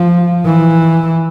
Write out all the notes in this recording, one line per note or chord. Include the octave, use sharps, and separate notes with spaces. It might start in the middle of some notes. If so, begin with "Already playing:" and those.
Already playing: F3
E3